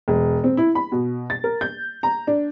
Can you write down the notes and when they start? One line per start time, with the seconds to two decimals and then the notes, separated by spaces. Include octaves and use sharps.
0.08 E1
0.44 C4
0.57 E4
0.75 B5
0.92 B2
1.30 A6
1.44 A#4
1.61 G6
2.03 A#5
2.27 D4